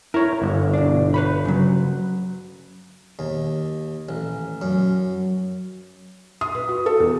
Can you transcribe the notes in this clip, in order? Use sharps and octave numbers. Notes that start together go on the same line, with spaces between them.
E4 A#4 C#5
G1
B2 D4
B4 C#5 B5
C#3 F#3
D#2
A1
F#2
D#6
B4
F#4
A4
E2